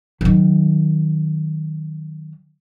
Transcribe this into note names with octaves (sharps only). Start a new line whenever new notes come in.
D#3 F#3